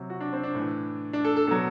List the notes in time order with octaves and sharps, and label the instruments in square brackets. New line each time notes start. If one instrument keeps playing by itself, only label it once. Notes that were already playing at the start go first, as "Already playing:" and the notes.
Already playing: [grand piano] C3 F#3
F#4
D4
C4
D4
A2 E3
D4
A4
A4
B2 F#3 A4